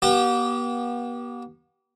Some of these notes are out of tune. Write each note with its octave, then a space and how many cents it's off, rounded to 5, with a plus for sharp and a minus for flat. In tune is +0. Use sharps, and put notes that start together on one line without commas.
B3 -45 G4 -30